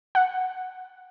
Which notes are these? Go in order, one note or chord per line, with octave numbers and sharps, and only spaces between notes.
F#5